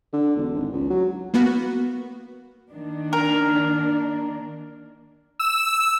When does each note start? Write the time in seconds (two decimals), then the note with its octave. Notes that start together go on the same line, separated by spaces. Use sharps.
0.13 D3
0.37 E1
0.55 G#1
0.73 C#2
0.90 F#3
1.34 A#3 B3 F#4
2.72 D#3 A#3 D4
3.13 A#4
5.39 E6